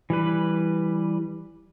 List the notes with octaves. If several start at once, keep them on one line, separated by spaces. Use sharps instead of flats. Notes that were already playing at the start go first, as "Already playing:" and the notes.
E3 G3 B4